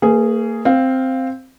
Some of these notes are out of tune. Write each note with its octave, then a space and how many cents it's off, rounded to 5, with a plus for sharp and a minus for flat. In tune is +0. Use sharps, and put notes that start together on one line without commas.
A#3 -40 G#4 +0 B4 +0
C4 +0 F5 +0